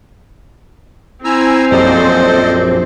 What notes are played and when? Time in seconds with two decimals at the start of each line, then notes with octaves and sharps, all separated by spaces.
1.24 C4 E4 G#5 A#5 E6
1.71 A#1 F#2 A4 C5 D5 D#5